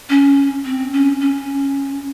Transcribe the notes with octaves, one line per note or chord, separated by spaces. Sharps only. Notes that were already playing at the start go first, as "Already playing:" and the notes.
C#4
C4
C#4
C#4